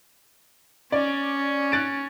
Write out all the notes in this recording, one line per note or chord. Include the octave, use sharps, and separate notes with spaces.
C#4 D5
F#6 A6 D7